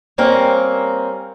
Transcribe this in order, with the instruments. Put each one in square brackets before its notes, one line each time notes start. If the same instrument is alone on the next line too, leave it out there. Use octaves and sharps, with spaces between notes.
[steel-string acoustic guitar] G3 A#3 C4 C#4 A#4